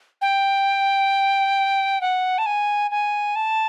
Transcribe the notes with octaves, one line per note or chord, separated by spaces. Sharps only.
G5
F#5
A5
G#5
G#5
A5